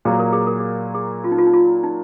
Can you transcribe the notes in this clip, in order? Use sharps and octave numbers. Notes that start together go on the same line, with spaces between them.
A#2 F#3 A#3 G#4
A#4
G#4
A#4
G#4
G#4
F4
D#4
F4
D#4
F4
D#4